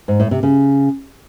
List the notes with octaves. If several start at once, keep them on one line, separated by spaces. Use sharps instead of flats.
G#2
A2
C3
C#3